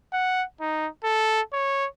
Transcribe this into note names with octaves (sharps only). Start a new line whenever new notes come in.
F#5
D#4
A4
C#5